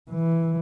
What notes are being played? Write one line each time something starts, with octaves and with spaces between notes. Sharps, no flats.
E3